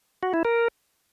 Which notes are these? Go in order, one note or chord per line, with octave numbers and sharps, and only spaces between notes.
F#4
E4
A#4